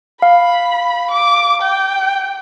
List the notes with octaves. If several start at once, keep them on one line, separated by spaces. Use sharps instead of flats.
F5 B5
D6
G5